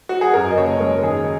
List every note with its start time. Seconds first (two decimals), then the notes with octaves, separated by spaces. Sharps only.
0.09 F#4
0.21 G#4
0.34 F#2 A#4
0.51 D#5
0.57 F#1 C#5
0.80 G#3 A#4
1.03 D#3 G#4